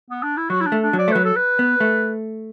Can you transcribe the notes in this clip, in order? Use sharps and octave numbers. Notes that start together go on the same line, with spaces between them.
B3
D4
E4
F#3 F#4
E4
D4
A3
D4
F#3
D5
A3
F#3 B4
A4
B4
B3
A3